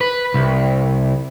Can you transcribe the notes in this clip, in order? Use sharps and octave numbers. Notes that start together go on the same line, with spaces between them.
B4
C2